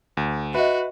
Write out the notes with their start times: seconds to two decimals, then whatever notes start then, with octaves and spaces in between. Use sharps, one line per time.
0.17 D2
0.55 F#4 B4 D#5 E5